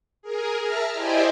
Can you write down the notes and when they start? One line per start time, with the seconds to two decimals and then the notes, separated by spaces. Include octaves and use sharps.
0.22 G#4 A#4
0.59 E5 A5 A#5 F6
0.92 E4 G4 C5 D5 D#5 G#5